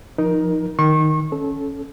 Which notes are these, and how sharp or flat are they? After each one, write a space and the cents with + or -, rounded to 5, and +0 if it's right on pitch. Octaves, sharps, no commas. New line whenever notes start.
F3 +0 D#4 +0 A#4 +20
D#3 +0 C#6 -35
C#4 +0 A4 -20